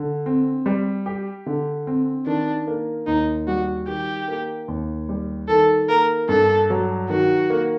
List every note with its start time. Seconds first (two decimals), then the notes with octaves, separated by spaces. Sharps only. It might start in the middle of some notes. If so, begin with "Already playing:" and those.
Already playing: D3
0.26 C4
0.66 G3
1.06 G4
1.46 D3
1.87 C4
2.26 D#3 D4
2.67 A#3
3.07 D#2 D#4
3.48 G3 F#4
3.88 D#3 G4
4.28 A#3
4.68 D#2
5.09 G3
5.49 D#3 A4
5.89 A#3 A#4
6.29 G2 A4
6.70 F#3
7.10 D#3 F#4
7.50 A#3